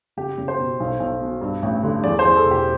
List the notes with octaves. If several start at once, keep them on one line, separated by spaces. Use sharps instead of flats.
F#1 G4
F#1
C5
B2
B1
B1
B2
G2
A1
D3
E2 D5
C5
E2
A4
E1
G4